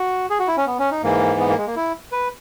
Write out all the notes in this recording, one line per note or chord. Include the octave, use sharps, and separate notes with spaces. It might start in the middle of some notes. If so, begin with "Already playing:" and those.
Already playing: F#4
G#4
F#4
E4
C#4
B3
C#4
D#4
G#2 E3 A#3
B3
A#3
G#3
A#3
E4
B4